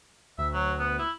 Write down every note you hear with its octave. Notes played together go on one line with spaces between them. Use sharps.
D2 E5
F#3
B3
E4